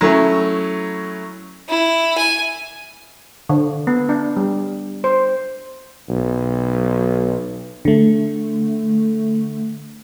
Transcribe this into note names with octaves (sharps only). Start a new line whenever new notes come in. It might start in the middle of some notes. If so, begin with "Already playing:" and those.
F#3 A3 C#4 E4
E4
G#5
D3
B3
D4
G3
C5
B1
D3 A3